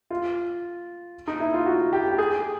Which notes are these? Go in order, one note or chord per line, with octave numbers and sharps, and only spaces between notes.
F4
D#4
E4
F4
F#4
G4
G4
G#4